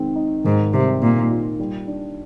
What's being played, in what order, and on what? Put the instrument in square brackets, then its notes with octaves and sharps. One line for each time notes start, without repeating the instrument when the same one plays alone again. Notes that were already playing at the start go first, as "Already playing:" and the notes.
Already playing: [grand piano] D#3 G#3 C4
D#4
[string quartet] G#2 [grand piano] D#3
[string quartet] C3 [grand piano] G3
[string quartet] A#2 [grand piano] A#3
[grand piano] F4
G3
D4